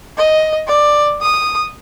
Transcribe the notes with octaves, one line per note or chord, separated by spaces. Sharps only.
D#5
D5
D#6